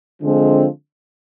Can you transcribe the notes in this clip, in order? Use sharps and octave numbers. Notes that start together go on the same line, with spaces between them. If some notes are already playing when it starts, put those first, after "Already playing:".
D3 F3 G#3 C4